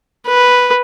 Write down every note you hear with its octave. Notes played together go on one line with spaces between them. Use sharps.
B4